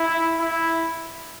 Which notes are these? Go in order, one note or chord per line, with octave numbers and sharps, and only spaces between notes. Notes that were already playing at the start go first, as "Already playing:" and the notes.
Already playing: E4
E4